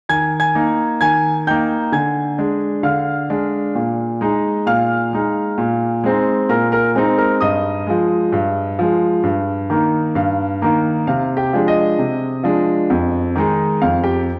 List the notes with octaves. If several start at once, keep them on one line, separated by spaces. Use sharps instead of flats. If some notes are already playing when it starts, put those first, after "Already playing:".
D#3 G#5 G#6
G#5 G#6
A#3 D#4
D#3 G#5 G#6
A#3 D#4 G5 G6
D3 G#5 G#6
G#3 D4
D3 F5 F6
G#3 D4
A#2
G#3 D#4
A#2 F5 F6
G#3 D#4
A#2
G#3 C4 D#4
A#2 A#4 A#5
A#4 A#5
G#3 C4 D#4
A#4 A#5
G2 D#5 D#6
F3 G#3
G2
F3 G#3
G2
D#3 A#3 D#4
G2 F5
D#3 A#3 D#4
C3 F5
G4 G5
F3 G#3 D4
D#5
C3
F3 G#3 D4
F2
D#3 G#3 D#4
F2 F5
G4 G5